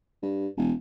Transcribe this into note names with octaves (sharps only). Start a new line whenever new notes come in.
G2
E1